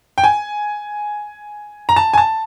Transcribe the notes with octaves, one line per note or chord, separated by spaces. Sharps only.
G5
G#5
A#5
A5
G#5
A5